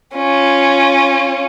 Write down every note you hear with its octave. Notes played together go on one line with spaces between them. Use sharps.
C#4 F4